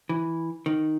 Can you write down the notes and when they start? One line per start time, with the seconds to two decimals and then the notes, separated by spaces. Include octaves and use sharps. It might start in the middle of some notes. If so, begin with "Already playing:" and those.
0.09 E3
0.66 D#3